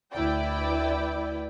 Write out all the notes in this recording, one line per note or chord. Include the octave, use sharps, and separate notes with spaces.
D2 E4 B4 D5 G5